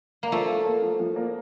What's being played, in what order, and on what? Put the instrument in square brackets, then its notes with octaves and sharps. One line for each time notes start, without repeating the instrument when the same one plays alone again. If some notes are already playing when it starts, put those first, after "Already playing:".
[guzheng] A#3
[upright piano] F3 [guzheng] A3
[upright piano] F4
A#3
F3
F3
A#3